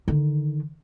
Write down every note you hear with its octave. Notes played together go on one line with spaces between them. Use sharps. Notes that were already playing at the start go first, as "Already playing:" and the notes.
D3 D#3